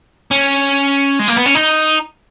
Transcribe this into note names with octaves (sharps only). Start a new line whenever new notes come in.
C#4
G#3
A#3
B3
C#4
D#4